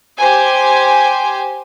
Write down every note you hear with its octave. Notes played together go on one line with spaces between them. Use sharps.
G4 C5 G#5